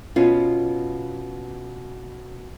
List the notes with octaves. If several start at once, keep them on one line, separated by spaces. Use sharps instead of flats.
B2 B3 C#4 F4